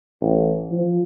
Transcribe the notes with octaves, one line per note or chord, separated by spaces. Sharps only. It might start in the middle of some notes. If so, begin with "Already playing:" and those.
A1
F3